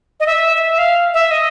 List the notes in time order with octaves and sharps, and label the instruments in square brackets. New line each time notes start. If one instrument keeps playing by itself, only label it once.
[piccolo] D#5
E5
E5
F5
E5
D#5